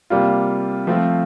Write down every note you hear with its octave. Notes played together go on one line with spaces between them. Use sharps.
C3 G3 A#3 F4
F3 A3 C4 F4